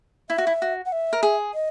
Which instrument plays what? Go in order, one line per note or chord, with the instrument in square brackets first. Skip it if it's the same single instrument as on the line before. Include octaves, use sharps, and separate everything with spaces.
[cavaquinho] E4 [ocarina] E5
[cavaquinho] F#4
E4
F#4
[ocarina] F#5
E5
[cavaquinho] A#4
G#4
[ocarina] D#5